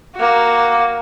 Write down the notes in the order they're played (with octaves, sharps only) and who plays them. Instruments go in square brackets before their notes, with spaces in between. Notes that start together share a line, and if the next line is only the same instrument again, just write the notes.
[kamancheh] A#3 F#4